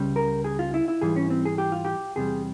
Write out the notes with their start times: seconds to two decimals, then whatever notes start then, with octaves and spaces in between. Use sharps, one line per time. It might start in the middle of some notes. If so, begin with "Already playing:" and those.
Already playing: C#2 C#3 G3
0.16 A#4
0.44 G#4
0.59 F4
0.74 E4
0.88 E4
1.01 G#2 E3 G3 G#4
1.16 C#4
1.30 C4
1.45 G#4
1.58 G4
1.72 F4
1.85 G4
2.16 E2 C3 G3 G#4